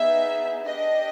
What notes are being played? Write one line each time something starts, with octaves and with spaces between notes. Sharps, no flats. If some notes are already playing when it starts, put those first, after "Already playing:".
Already playing: B3 D#4 G#4 E5
D4 G4 D#5